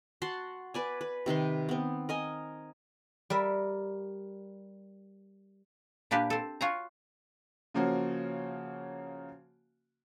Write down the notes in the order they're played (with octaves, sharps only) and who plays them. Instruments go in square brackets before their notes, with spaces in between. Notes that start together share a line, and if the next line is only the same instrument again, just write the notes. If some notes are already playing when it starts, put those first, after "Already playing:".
[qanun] F#4 F#5 A5 C6
B4 D5 G#5
B4
C3 D#3 B4 C6
B3 C4
A#4 D#5 G#5
[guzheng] G3 A#4 E5
[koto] A#2 A#3 D4 G4 B4
C4 A4
F4 F#4 C#5 G#5 A#5
[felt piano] C#3 F3 A#3 C#4 F#4